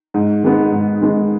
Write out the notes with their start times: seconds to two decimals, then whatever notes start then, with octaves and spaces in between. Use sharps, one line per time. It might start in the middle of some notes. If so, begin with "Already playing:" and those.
0.14 G#2
0.43 D#3 G#3 B3
0.72 G#2
1.01 D#3 G#3 B3